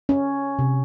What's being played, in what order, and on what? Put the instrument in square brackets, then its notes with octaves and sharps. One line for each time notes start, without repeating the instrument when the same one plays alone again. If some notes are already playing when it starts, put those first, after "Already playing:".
[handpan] C#4
C3